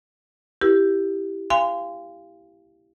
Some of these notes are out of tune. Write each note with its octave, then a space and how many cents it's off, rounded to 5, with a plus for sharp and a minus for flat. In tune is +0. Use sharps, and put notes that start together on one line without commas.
E4 +0 G4 +0 A#4 +35
F5 -15 G#5 -35 C6 -25